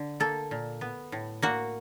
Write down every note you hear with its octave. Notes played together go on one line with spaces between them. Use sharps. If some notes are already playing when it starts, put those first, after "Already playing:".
Already playing: D3
A#3 A4
A#2
B3
A2
A#3 F#4